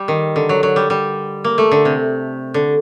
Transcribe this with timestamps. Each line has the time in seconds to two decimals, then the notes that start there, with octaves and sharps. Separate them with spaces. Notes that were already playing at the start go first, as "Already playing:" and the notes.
Already playing: G3
0.08 D#3
0.36 D3
0.49 F#3
0.63 F#3
0.76 G3
0.90 G3
1.44 A#3
1.58 A3
1.71 D3
1.85 C3
2.54 D3